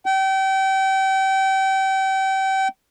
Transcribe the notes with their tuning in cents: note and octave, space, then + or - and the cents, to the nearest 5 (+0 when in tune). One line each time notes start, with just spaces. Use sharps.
G5 -30